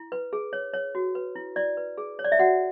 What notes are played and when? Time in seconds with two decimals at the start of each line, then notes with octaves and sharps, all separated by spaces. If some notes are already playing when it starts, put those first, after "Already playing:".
Already playing: E4
0.12 B4
0.33 G#4
0.53 C#5
0.74 C#5
0.95 F#4
1.15 B4
1.36 E4
1.56 E4 D5
1.77 B4
1.98 G#4
2.19 C#5
2.25 D5
2.32 E5
2.39 F#4 F#5